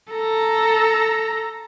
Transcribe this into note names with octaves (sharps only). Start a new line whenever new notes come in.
A4 A#5